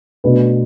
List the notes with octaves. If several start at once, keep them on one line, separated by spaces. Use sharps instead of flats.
B2 A3 D4 F#4 B4